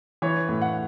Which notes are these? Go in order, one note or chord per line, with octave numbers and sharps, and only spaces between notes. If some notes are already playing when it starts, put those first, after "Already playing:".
E3 C#5
A2
F#5